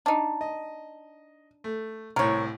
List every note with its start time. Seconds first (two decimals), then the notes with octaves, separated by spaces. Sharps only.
0.06 D4 D#4
0.41 D#5
1.64 A3
2.16 C2 A2 A#4 C#5